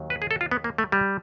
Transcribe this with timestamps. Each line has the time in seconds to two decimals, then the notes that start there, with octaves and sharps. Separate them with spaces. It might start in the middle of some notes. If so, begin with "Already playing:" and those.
Already playing: D#2 D#3 F#3
0.10 B4
0.22 G#4
0.31 A4
0.41 F4
0.51 B3
0.64 A#3
0.78 A3
0.92 G3